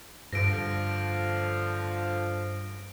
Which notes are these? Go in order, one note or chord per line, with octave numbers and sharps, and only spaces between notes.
G2 D3 F3 A#6 D7